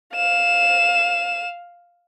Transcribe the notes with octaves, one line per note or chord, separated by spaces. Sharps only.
F5 E7